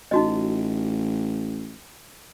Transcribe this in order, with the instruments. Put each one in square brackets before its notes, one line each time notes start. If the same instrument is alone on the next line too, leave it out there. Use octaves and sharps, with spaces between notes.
[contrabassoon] A1 [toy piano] D#4 F#4 D#5